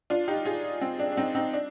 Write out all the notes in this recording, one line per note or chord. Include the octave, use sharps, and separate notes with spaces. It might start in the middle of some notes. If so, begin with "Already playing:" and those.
D4 F4
D#4 G4
F4 G#4
C4
D4
D4
C4 D#4
C4 D#4
D4